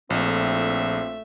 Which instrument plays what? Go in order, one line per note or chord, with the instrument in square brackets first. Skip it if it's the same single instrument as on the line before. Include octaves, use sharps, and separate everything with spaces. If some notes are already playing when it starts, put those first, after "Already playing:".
[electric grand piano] A#1 [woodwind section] A2 F3 C4 [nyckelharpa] A3 E5